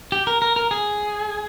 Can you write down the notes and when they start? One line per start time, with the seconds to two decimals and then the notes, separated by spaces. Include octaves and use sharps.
0.12 G4
0.27 A#4
0.42 A#4
0.56 A#4
0.71 G#4